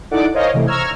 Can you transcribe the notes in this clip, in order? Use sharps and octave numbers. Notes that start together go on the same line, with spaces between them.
D#4 E4 A4 D5 F#5 D6
A#4 C5 C#5 D#5 F5 G#5
C3 E3 A3
A#5 C#6 E6 F6 G#6